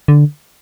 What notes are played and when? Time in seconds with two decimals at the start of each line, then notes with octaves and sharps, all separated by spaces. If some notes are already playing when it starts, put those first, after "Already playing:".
0.08 D3